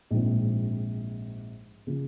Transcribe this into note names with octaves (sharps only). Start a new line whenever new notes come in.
A#1 G#2 F3 C4
C#3 F3